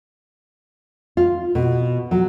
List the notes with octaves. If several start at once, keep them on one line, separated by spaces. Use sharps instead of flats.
F4
B2
F#3